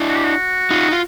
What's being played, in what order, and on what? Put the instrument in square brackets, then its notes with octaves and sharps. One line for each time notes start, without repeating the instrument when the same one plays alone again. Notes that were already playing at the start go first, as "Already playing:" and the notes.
Already playing: [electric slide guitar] D4 E4
[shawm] F#4
G4
F#4
[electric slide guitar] D#4 F4
F4